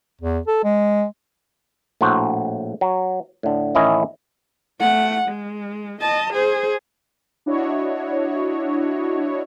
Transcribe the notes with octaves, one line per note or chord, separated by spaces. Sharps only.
E2
A4
G#3
A#1 A2 F#4 C5
F#3
A2 D3
A1 D#3 C#4 E4 D#5 E5
A3 F#5
G#3
D#5 A5
G#4 C5
D4 E4 F#4 C#5 D#5